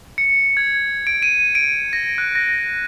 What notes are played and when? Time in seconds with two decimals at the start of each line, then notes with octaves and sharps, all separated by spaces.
0.18 C#7
0.57 G#6
1.07 D7
1.22 D#7
1.55 D7
1.93 A#6
2.18 F#6
2.35 A#6